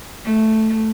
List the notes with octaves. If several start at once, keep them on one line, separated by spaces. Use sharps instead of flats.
A3